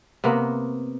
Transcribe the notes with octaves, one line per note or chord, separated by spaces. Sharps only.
C3 A#3 B3